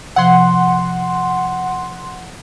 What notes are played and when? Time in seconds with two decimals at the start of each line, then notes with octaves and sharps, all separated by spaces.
0.16 C3 F3 F#5 C6